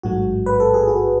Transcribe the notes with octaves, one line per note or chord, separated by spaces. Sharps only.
A1 G#2 F#3 A3 F#4
B4
A4
G#4
F#4